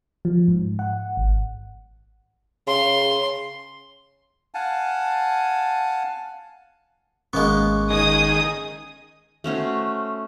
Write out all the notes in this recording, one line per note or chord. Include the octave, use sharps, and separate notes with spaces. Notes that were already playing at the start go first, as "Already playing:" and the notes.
F3
G#2
F#5
G#1
C#3 C6
F5 F#5 G#5 A5
G#1 G#3 A#3 B3 C#4 C#6
D#3 G#4 D#6
A3 C#4 F#4 C5